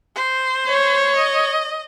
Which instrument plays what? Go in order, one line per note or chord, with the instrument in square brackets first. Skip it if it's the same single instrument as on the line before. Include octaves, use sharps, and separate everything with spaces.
[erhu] C5
[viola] C#5
[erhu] D#5